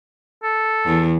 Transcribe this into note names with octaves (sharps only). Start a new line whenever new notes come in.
A4
E2